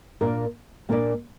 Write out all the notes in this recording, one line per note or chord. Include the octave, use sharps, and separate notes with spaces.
A#2 A#3 D4 A#4 D5
A#2 A#3 D4 A#4 D5